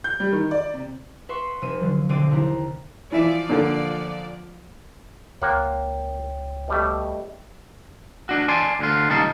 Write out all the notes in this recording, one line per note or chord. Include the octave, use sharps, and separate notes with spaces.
G6
G3
D#3
D5
C3
B4 E5 F#5 C6 C#6
F1 C3 C4 E5 D#7
D3 F3 F#3
B1 D3 C4 G5 D6 D#7
D#2 C3 E4 A#5
E3 F3 D5 E5
A#2 D3
C#2 A#3 F4 C#5 F#5 G5
B2 G3 A3
D4 F#4
D5 G#5 A5 C6
D2 D3 F4
C#2 A#2 D#3 G3 D#4 A5